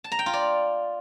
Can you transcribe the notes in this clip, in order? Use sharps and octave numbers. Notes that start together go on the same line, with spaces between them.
A5
A#5
G5
F4
D5